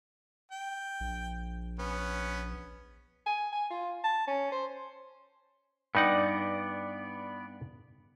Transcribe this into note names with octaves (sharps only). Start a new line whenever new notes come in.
G5
A#1
B3 C#4
G#5
G#5
F4
A5
C#4
C5
G2 B3 D#4 D5 F#5